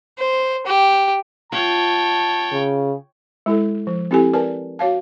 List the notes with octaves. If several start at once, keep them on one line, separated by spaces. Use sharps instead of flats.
C5
G4
F4 C#5 G5 A5
C#3
G#3 E4 A4
F3
C4 E4 G4 A4 G#5
A#4 B4 D5 G#5 A5
F#4 C#5 F5 A5